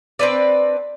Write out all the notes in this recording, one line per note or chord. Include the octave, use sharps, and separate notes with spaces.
C4 D4 B4 D5